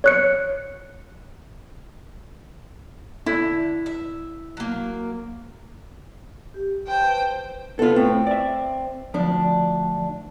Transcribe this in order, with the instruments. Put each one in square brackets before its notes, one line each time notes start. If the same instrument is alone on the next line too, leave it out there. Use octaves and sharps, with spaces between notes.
[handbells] C#5 F#6 C#7
[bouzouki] D3 [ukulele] E4
[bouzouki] E5
F#3 A#3
[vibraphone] G4
[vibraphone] B4 A5 [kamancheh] C5 [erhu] G5
[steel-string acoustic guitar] B3 F4 [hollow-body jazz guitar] A4 B4
[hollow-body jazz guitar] A2 [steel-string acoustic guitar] C4
[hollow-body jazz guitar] D5 E5
[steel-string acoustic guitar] D2 D4 [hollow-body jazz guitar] F3